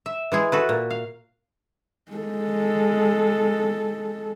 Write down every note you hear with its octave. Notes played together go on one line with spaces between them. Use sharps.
E5
E3 G#3 G#4
F#4 A4 B4
A#2
F5
G#3 A4